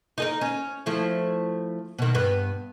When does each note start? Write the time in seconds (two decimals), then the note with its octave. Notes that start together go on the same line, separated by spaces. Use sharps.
0.18 D#4 A4 A#4
0.41 C#4
0.86 F3 A3 E4
1.99 B2 D#3
2.15 G2 B3